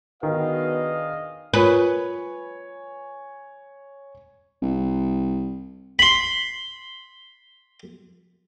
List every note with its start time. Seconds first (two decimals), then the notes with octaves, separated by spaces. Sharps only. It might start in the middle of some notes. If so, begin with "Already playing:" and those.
0.23 D#3 B3 D4 F#4 G#4 B4 D#5 F5
1.54 F4 A#4 B4 C#5 G#5
4.62 C2
5.99 B5 C6